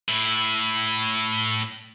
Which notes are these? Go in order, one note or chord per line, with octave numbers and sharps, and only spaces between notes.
A2 E4